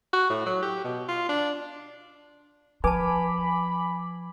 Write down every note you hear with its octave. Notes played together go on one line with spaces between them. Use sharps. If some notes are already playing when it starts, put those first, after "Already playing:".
F#4
A2
F#3
G4
B2
F4
D4
F3 B4 G#5 A5 B5 D6